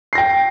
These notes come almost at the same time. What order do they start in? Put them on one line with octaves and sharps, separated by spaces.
C7 A#6 G5